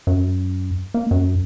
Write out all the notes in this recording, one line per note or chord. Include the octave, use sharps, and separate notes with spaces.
F#2
A#3
F#2